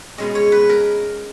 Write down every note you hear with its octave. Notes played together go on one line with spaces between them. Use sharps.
B2 G#3 C#4 D#5
C#5
B4
A#4